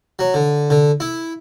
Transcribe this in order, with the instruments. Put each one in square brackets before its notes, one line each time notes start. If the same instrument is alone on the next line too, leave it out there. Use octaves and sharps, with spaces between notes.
[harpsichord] F#3
D3
D3
E4